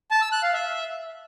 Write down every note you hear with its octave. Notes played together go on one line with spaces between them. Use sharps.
A5
E6
F#6
F5
E5